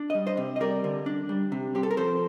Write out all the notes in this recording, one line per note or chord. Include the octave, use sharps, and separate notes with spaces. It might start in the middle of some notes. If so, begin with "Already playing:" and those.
Already playing: D4
D#5
G3
C5 D#5
C3
D#5
G3 A#4 D5
D3
D4
G3
C3
C4 G4
A4
A#4
F3 A4 C5